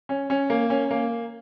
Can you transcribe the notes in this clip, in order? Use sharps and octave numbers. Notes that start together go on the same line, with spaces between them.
C#4
C#4
A#3
C#4
A#3